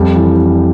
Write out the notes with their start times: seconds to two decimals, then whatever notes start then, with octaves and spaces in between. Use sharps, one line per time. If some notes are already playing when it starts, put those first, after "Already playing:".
Already playing: F2 G3
0.16 E3